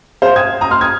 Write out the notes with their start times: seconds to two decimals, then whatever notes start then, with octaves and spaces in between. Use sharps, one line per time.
0.22 C5 F5
0.36 D#6 G#6
0.61 A#5 D#6
0.71 C6 F6
0.81 D#6 G#6